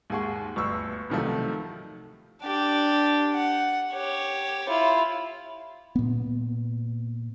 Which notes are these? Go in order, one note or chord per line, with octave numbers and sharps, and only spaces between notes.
D#2 G#2 G#4 F#5 C#6
G1 D2 C#6 E6
C2 C3 D#3 F3 F#3 A3
D4 G4
F#5
G4 C#5
E4 F4
A#2 B3